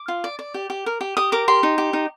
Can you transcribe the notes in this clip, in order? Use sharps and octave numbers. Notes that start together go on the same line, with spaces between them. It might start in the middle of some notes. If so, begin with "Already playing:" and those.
Already playing: D6
F4
D5
D5
G4
G4
A#4
G4
G4 D#6
A#4 D6
G4 C6
D#4
G4
D#4